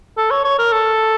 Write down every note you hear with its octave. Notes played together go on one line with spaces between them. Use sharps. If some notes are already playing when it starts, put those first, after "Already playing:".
A4
C#5
C#5
A#4
A4